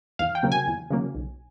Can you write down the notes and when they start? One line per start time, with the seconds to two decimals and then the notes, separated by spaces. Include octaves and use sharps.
0.19 E2 F5
0.35 G5
0.43 C#3 F#3 A#3
0.52 G#5
0.67 E2
0.90 C#3 F#3 A#3
1.15 B1